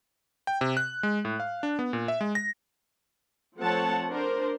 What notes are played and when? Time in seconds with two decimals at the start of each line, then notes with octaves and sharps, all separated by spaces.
0.47 G5
0.61 C3
0.77 F#6
1.03 G#3
1.25 A2
1.40 F5
1.63 D4
1.79 B3
1.93 A#2
2.08 E5
2.21 G#3
2.35 A#6
3.60 F3 A3 C4 C#5 F#5 A5
4.12 D4 A#4 C5